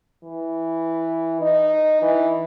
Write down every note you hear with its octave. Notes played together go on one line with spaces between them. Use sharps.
E3
D#4
E3